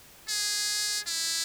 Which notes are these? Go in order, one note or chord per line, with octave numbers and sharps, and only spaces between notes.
G#4
E4